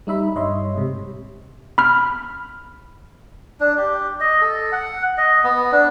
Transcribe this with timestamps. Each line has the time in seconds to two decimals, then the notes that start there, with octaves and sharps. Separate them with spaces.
0.07 G3 D#4 E5 B5
0.35 G2 C#5 D#5 E5 C6
0.75 G#2 C3
1.78 B5 F6
3.60 D4
3.78 G4
4.20 D#5
4.41 A4
4.72 F#5
5.17 D#5
5.44 B3
5.72 D4